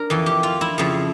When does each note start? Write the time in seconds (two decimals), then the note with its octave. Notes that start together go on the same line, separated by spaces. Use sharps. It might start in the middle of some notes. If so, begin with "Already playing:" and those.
Already playing: D4 A#4
0.10 F2 E3
0.26 G4
0.43 F4
0.61 E4
0.78 F2 C#3 F3